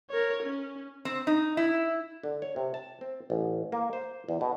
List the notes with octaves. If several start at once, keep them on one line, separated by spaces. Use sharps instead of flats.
A#4 C#5
C#4
C4
D#4
E4
D3
C#5
C3
A5
C4
A1
A#3
C5
E2
B2